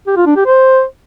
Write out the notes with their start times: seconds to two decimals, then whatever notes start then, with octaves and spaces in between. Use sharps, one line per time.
0.07 G4
0.17 F4
0.26 D4
0.36 G4
0.46 C5